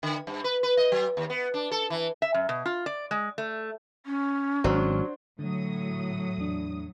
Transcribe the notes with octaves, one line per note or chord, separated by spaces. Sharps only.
D3
G2
B4
B4
D#5
F#3
D#2
B3
D4
A4
E3
E5
F#2
B2
F4
D5
G#3
A3
C#4
G#1 F#3 D4 C5
A2 D3 F#3 D#6
E2 D4